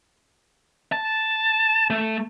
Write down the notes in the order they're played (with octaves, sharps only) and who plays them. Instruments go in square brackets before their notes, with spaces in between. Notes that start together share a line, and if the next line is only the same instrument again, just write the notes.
[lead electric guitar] A5
A3